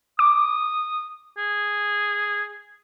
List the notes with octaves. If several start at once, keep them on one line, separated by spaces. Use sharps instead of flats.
D6 D#6
G#4